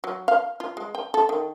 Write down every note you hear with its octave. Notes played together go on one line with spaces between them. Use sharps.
F#3
F5
F4
G#3
G5
A4
D#3